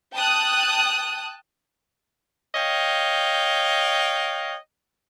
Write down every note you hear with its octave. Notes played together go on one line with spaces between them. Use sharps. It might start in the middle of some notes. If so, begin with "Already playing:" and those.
G5 A5 D#6 F#6
C#5 D#5 F5 G5